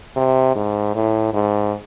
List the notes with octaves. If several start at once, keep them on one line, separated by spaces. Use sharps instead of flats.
C3
G#2
A2
G#2